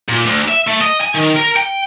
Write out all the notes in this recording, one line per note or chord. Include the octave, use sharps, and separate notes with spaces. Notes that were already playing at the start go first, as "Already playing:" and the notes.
A#2
D2
E5
A3
D#5
G#5
D#3
A#4
G5